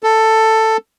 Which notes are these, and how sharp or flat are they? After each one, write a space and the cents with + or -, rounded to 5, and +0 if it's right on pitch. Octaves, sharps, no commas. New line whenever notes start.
A4 +10